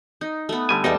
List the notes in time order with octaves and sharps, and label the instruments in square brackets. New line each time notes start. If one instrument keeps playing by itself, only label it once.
[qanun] D#4
A3 B3
[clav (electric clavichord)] D3 G3 G#5
[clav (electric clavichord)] E2 D#4 [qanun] G3 A3 A5